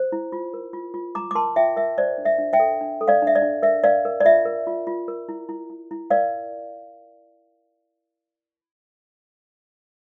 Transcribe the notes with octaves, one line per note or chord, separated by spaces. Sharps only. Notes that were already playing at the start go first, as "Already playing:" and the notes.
Already playing: C5
E4
F4
A#4
F4
F4
F4 A#5 D6
D6
A#4 A5 C6
F4 E5 G5
A#4 E5
C5 D5
D4
E5
D4
E5 G5
A4
D4
A4
D5 F5
D4 E5
D5
D4
A#4 E5
A#4 D5 F5
A#4
D5
F4 E5
A#4
F4
F4
A#4
E4
E4
E4
E4
A#4 D5 F5